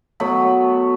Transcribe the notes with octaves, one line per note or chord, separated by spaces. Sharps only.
B2 F#3 A3 B5